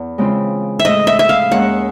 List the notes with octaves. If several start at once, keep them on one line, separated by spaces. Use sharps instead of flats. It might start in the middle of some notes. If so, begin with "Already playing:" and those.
Already playing: E2
C#3 E3 G#3 C4 F4
E5
A2 E3 G#3 D#5
E5
E5
F5
D#2 D#3 G#3 C#4 F#5